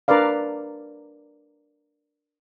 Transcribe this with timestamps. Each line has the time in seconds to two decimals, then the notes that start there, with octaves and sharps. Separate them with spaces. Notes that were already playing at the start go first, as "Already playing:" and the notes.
0.08 D4 A#4 B4 D5 F5